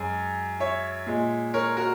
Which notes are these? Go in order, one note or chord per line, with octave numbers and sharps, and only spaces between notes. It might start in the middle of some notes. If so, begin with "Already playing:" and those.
Already playing: F#2 G#3
C#5 E5
A#2 G#3
A#4 C#5
F#4 A#4